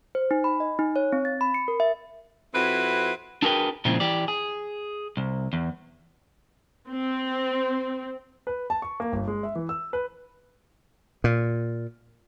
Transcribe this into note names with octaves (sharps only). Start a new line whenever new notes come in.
C5
D#4
B5
D#5
D#4
C#5
C4
A6
B5
C#7
A#4
E5
F2 C4 E4 F#4 B4
D4 F#4 G#4 A#4 B4 G5
A#2 C#3 F3 G#3 C4 E4
E3 G4 D5
G#4
C2
E2
C4
B4
A5
C#6
A#3
G1
G#3
E5
E3
E6
B4
A#2